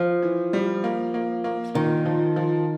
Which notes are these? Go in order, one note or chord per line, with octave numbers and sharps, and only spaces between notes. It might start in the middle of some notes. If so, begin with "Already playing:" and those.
Already playing: F3
E3
G3
A#3
A#3
A#3
A#2 D#3
F3
F3